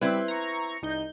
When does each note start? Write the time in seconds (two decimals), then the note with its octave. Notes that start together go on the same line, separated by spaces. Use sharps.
0.01 G3 C4 E4 B4
0.28 A#5 C#6
0.82 C2 D#4 G6